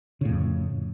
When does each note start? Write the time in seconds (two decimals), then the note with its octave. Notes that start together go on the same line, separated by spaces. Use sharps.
0.21 C#3
0.25 A2
0.29 F2